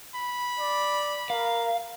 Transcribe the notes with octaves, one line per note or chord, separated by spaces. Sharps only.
B5
D5
A#4 F5